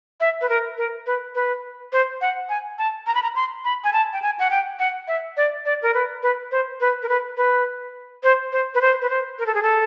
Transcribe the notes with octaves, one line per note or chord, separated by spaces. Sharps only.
E5
B4
A#4
A#4
B4
B4
C5
F#5
G#5
A5
A#5
B5
A#5
C6
B5
G#5
A5
G5
G#5
F#5
G5
F#5
E5
D5
D5
A#4
B4
B4
C5
B4
A#4
B4
B4
C5
C5
B4
C5
B4
C5
A#4
A4
G#4
A4